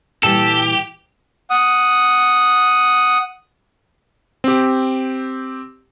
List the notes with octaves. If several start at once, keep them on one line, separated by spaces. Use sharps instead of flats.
A#2 E3 G3 G4 A4
F#5 D#6
C4 G4